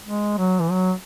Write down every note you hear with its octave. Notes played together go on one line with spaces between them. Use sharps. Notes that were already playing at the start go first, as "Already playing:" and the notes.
G#3
F#3
E3
F#3